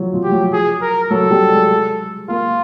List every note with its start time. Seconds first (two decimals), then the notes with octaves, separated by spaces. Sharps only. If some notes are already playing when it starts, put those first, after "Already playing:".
Already playing: F3 F#3
0.13 F3
0.23 G4
0.32 F#3
0.53 G#4
0.81 A#4
1.11 F#3 A4
1.31 G3
1.51 G#3
2.28 A#3 F4